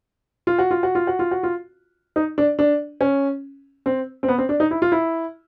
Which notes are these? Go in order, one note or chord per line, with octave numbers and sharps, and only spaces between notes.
F4
F#4
F4
F#4
F4
F#4
F4
F#4
F4
D#4
D4
D4
C#4
C4
C4
B3
C4
D4
D#4
E4
F4
E4